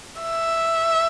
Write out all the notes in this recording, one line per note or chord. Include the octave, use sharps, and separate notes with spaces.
E5